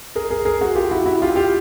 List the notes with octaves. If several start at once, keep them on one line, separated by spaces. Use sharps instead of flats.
G#4 A#4
G#4 A#4
G#4 A#4
F#4 G#4
F4 G4
E4 F#4
E4 F#4
F4 G4
F4 G4